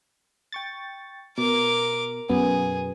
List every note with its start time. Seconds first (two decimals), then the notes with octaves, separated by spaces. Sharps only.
0.52 G5 C#6 A6
1.38 B2 A#4 D6
2.29 F#2 B2 B3 G#4